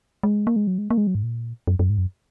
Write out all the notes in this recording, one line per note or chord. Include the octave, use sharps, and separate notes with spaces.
G#3
A#3
G#3
F#3
G#3
A#3
G#3
F#3
G#2
A#2
F#2
F#2
G#2
F#2